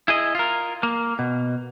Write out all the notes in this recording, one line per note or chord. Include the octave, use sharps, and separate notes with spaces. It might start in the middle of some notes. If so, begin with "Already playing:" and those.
E4 G#4 D#5
F4 A#4
A#3
B2